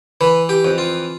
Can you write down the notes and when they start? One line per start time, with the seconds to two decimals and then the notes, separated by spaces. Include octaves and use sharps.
0.21 E3 B4
0.49 G4
0.65 F2
0.78 F4